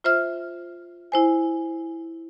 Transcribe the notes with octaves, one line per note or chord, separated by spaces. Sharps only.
F4 C5 E5 F6
E4 C5 G#5